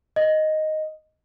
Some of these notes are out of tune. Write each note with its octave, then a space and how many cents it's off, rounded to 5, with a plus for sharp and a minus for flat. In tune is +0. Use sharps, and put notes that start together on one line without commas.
D#5 +0